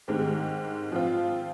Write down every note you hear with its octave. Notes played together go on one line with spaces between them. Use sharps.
G#2 D#3 G#3 C4 G4
F3 C4 F4